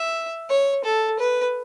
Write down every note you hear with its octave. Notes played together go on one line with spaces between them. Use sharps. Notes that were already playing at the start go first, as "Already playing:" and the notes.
Already playing: E5
C#5
A4
B4